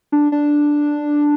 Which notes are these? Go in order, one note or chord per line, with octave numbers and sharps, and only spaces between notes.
D4
D4